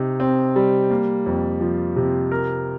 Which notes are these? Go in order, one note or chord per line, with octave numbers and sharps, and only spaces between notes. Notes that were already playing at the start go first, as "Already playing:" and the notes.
Already playing: C3 D#4
C4
G3
A#3
F2
F3
C3
A#4